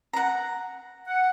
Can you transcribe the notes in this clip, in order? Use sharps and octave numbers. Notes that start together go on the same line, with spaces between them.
F#5 A#5
F#5